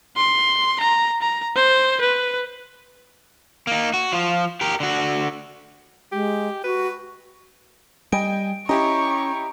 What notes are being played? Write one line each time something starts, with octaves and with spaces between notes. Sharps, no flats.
C6
A#5
A#5
C5
B4
A#3 D#4
F#4
F3 F4
G4 A#4
D3 F#4
G#3 G4
F#4 B4
G3 D#5 G5 G#5 D7
C#4 E4 G4 D#5 A#5 C#6